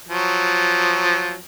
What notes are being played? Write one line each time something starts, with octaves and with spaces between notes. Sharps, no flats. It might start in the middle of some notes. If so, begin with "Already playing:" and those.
F3 F#3